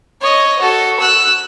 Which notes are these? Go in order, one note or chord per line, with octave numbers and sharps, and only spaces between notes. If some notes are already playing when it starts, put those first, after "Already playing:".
C#5 D#5
F#4 A4
E6 F#6